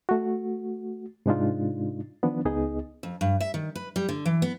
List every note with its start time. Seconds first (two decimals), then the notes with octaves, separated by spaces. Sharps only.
0.09 A3 F#4
1.26 G#2 C3 G#3 D4 D#4 F4
2.23 D#3 F3 B3 D4
2.45 C#2 B3 D#4 G#4 D#5
3.03 F2
3.21 G2
3.40 E5
3.54 D#3
3.75 B4
3.96 G3
4.09 D3
4.26 E3
4.42 B3